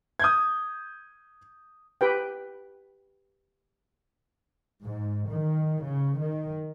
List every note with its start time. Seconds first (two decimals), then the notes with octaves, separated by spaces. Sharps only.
0.20 D#6 G6 G#6
2.01 G4 B4 G5
4.84 G#2
5.29 D#3
5.86 C#3
6.18 D#3